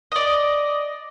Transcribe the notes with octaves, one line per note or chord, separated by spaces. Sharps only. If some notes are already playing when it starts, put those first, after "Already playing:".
D5 D#5